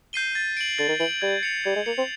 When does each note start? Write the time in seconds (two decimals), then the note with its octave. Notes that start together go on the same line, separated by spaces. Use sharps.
0.13 G6 C7 D#7 G7
0.35 A6
0.57 D7 F#7
0.78 D3 A6
0.88 D#3
1.00 E3 D7 F#7
1.22 G3 G#6
1.43 C#7 F7
1.64 G3 G#6
1.76 G#3
1.86 A#3 C#7 F7
1.98 C4